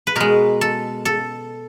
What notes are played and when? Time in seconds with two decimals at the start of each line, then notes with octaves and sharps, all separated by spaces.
0.07 B4
0.16 B2 G#3 A#4
0.61 A4
1.05 A4